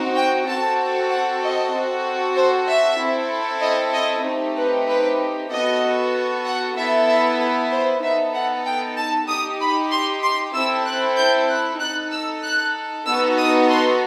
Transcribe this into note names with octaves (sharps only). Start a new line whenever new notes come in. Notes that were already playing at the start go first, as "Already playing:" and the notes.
Already playing: C4 D#4 F#4
G5
C4 F#4 A4 A5
F#5
D#5
C4 F#4 A4
C5
E5
C4 E4 A4
D#5
D#5
A3 C4 D#4 G4
B4
B4
B3 F#4 A4 D#5
F#5
B3 E4 A4 E5
E5
A4
C5
B3 D#4 A4 E5
F#5
G5
A5
D#4 G4 D#6
B5
C6
C6
C4 E4 A4 E6
F#6
G6
F#6
D#4 A4 F#6
E6
F#6
B3 D#4 F#4 A4 E6
D#6
C6